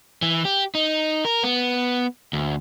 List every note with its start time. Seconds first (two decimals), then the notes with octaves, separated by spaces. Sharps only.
0.22 E3
0.45 G4
0.75 D#4
1.25 A#4
1.43 B3
2.33 D2